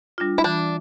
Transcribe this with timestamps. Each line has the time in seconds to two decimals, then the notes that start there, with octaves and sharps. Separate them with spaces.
0.18 G3 D4 F4
0.38 E4
0.44 E3 D4